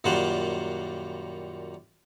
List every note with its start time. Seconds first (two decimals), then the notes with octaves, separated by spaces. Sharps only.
0.04 F#2 A#2 D#3 G3 C5 F#5